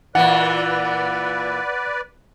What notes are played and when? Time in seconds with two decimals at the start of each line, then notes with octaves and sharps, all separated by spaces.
0.15 A#2 E3 B4 D5 F#5